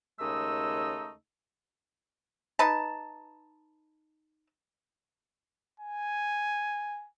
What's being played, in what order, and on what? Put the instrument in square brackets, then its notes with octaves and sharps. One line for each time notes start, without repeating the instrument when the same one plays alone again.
[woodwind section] D#2 C#3 G#3 A3 D#4 E6
[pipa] D#4 B4 A5
[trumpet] G#5